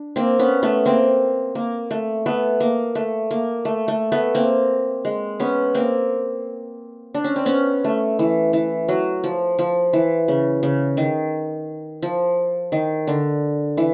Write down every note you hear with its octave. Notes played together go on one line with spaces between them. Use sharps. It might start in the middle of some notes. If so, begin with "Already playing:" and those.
Already playing: D4
A#3 C4
B3 C#4
A3 B3
A#3 C4
A#3
A3
A3 B3
A#3
A3
A#3
A3
A3
A3 B3
A#3 C4
G#3
B3 C#4
A#3 C4
D4
C#4
C4
B3 C#4
A3
E3
E3
F#3
F3
F3
E3
C#3
C#3
D#3
F3
D#3
D3
E3